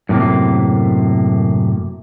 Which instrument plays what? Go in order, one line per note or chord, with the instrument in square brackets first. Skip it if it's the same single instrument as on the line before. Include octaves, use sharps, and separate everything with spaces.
[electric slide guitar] F#2 A2 C3 A#3